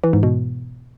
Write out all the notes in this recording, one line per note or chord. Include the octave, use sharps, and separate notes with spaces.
E3
G#2
B2